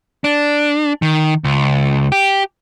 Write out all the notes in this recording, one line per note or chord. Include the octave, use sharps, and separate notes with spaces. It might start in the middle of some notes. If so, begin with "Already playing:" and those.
D4
D#3
C#2
G4